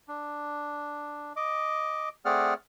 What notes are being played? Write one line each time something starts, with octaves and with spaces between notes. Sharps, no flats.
D4
D#5 D6
A3 C4 G#4 D5 F#5 F6